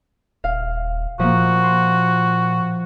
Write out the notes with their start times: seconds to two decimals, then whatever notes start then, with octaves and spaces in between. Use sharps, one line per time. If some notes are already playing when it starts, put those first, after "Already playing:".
0.44 D#1 F5
1.20 A#2 F3 A#3 F#4
1.64 C6